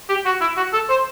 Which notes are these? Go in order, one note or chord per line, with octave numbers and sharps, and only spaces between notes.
G4
F#4
E4
F#4
A4
C5